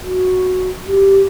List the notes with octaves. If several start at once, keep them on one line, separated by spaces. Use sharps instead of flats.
F#4
G4